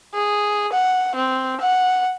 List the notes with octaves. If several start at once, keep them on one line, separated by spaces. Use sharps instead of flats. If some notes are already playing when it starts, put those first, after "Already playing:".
G#4
F#5
C4
F#5